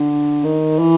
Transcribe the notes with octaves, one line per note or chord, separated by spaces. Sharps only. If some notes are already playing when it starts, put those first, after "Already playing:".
Already playing: D3
D#3
E3